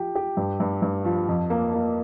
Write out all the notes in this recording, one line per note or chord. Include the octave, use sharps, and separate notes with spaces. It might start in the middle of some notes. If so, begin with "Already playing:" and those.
Already playing: F3 G4
G4
G2
G2
G2
F3
F2
A#3
A#3